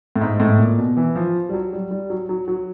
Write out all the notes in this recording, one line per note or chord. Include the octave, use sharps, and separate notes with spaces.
A2
G#2
A2
A#2
B2
E3
F3
G3
F#3
G3
G3
F#3
F#3
F#3